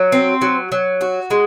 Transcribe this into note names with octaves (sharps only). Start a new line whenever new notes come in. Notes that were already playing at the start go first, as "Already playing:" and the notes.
Already playing: F#3
C4
F#3
F#3
F#4
G#3